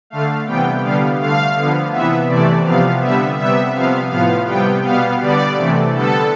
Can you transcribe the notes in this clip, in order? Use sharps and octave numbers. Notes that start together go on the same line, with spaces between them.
D3 A3 F5
C3 E3 G3 B3 G5
D3 G3 B3 F5
D3 A3 F5
D3 F3 B3
C3 E3 B3 E5
C3 E3 A3 D5
C3 F3 B3 F5
D3 G3 B3 E5
C3 G3 B3 E5
C3 F3 B3 F5
A2 F3 B3 F5
C3 G3 B3 G5
B2 G3 B3 F5
D3 G3 B3 D5
C3 E3 A3
D3 G3 B3 A4